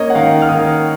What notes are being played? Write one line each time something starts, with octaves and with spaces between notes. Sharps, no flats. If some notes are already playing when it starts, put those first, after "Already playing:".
Already playing: A#3 C#4 C#5 D#5
F#5
D#3 F5
F6
D#3 D#6